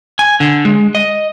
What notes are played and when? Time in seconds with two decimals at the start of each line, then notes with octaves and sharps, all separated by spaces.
0.19 G#5
0.40 D3
0.65 G#3
0.95 D#5